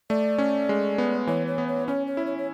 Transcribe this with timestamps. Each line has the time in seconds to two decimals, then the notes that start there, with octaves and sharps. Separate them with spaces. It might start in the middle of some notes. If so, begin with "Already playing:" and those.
0.10 A3 D5
0.38 C#4
0.69 G#3
0.98 B3
1.27 E3 C#5
1.47 C#5
1.58 B3
1.68 C#5
1.88 C#4 C#5
2.07 C#5
2.17 E4
2.27 C#5
2.38 C#5